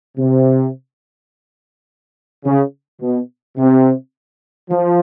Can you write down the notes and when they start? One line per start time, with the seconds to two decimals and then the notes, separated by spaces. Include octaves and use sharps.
0.17 C3
2.45 C#3
3.01 B2
3.58 C3
4.71 F3